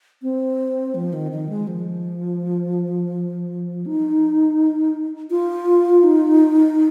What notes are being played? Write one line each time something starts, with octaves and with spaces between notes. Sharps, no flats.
C4
F3
D#3
D#3
G#3
F3
D#4
F4
D#4